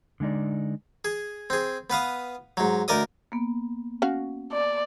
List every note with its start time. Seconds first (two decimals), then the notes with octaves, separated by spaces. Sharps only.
0.20 D3 G#3 D#4 D5
1.05 G#4
1.50 C4 G#4
1.90 B3 B4 F5 D#6
2.57 G#2 F#3
2.88 D2 A#4 D5 D#5 D#6
3.32 A#3 B3
4.02 C#4 F#4 F5
4.52 D5